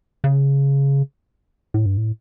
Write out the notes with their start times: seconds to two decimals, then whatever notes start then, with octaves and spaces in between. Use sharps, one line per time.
0.24 C#3
1.74 A2
1.86 G2
1.97 A2